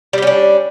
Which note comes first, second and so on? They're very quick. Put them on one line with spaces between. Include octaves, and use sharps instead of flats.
G3 G4 C#4 D4